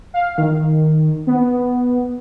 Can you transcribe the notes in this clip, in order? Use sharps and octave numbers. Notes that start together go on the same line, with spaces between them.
F5
D#3
B3